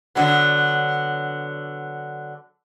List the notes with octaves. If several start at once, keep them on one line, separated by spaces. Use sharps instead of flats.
D3 F#3 B3